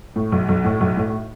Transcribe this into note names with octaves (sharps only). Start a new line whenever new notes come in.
A2
B1
B1
A2
B1
A2